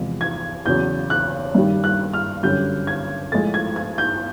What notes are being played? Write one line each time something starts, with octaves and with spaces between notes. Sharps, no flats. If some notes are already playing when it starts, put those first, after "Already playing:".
Already playing: E2 C3 F3 G#3
G#6
E2 C#3 F#3 G6
F#6
G2 D#3 G3
F#6
F6
F#2 D3 G3 G6
G#6
A2 F3 G#3 A6
G#6
G#6
G6